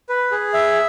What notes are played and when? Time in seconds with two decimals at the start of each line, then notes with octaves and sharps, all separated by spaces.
0.09 B4
0.32 G#4
0.54 E5